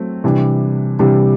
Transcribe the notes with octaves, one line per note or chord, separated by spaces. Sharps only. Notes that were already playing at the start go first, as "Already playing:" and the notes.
Already playing: F#3 A3 C4
C3 E3 G3 D4
C3 E3 G3 D4